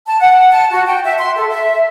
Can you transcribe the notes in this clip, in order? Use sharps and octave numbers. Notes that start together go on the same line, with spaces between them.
A5
F#5
A5
F#4
G5
E5
C6
A4
E5